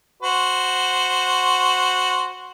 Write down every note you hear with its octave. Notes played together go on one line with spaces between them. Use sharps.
F#4 C5